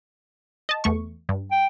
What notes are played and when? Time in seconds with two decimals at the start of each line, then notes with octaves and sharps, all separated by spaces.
0.69 D#5 A5
0.84 E2 A3 C#6
1.29 G2
1.51 G5